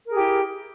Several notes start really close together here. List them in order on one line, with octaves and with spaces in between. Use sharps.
A#4 G#4 G4 E4